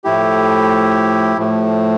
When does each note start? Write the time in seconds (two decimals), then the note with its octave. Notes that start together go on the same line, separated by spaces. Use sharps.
0.04 A2 F3 A3 E4 G4
1.38 A2 F3 A3